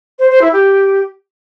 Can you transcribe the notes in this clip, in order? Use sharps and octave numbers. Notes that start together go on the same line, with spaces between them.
C5
C5
E4
G4